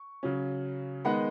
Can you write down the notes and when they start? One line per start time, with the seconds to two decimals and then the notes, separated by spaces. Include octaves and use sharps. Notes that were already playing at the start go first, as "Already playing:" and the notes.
Already playing: C#6
0.23 C#3 F#3 C#4
1.05 D#3 G#3 B3 D#4 F#5 B5